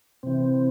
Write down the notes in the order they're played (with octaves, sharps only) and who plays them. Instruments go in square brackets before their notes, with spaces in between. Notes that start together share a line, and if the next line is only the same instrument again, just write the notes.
[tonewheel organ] C3 E3 C4